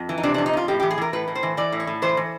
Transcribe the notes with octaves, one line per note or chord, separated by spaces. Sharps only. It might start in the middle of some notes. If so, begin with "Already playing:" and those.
Already playing: F2
E3
D#4
C3 D4
D4
F2
D#4
F2 F4
A2 G4
G4
E3
G#4
E3 A#4
A2 B4
A2
C5
E3
E3 D5
A2
C#5
A2
E3 C5
E3